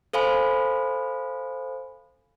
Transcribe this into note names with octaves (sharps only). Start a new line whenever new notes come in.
A4 C5 F5 G#5 B5